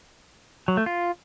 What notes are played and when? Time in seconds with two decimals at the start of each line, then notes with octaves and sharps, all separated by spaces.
0.68 F#3
0.77 A3
0.86 F4